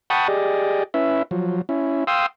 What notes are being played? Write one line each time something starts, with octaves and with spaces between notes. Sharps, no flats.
F#5 G5 A5 B5 C#6 D#6
G4 G#4 D5 D#5
C#4 E4 B4 E5
F3 F#3
C#4 E4
F5 G5 C6 D#6 E6